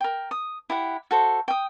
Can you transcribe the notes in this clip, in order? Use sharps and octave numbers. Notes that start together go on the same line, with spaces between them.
A#4 G5
D#6
E4 G4 F#5
F#4 A4 C5
G5 D#6